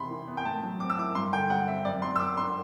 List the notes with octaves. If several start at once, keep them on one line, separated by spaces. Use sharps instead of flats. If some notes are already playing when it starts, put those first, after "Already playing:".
Already playing: E2 C3 B5 C6
E3
B3
G5
A2 A5
F#3
C4 D6
E6
E4 D6
G2 C6
D3 G5
G3 F#5
C4 E5
F#2 D5
F#3 C6
E6
B3 D6
D4 C6